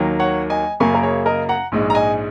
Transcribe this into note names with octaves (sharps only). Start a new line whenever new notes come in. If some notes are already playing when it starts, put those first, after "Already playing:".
Already playing: D#2 D#3 F#3 A#3
C#5 F#5
D#5 G#5
F#2 C#3 A#3 G#5 C#6
A#4
G#4 C#5
A#4 D#5
F#5 A#5
A#1 G#2 G#3
A#5
D#5 G#5